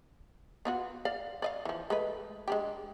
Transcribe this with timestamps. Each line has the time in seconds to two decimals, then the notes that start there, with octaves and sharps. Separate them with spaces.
0.65 B3 F4 F#4
1.05 D5 F5
1.42 D5 D#5 F5
1.65 E3 F3
1.90 G#3 A3 B4
2.48 G#3 D4 G4